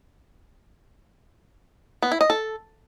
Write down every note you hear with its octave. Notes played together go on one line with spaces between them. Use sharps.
B3
E4
D#5
A4